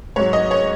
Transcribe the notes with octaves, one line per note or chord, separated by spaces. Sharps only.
G#2 F#3 C#5
D#5
C#5